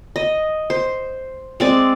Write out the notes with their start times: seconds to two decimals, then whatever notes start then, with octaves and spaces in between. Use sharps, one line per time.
0.16 D#5
0.70 C5
1.60 G#3 C4 D5